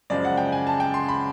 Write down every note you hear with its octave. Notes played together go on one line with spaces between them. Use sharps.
F#2 C#3 F3 G#3 D5
F#5
G5
G#5
A5
G5
C6
B5